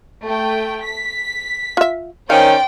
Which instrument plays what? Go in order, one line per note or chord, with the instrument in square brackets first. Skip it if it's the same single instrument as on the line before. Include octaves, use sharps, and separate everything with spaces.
[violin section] A3 G5
B6
[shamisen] F4 E5
[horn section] D#3 C#4 [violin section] C5 D5 [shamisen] F5 [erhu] G5